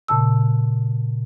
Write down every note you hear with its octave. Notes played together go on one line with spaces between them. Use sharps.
A#2 C#3 A5 E6